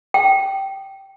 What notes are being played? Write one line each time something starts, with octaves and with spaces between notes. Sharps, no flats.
G5